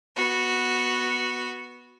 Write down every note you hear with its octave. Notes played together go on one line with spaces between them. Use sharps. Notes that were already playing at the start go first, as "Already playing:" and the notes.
B3 F#4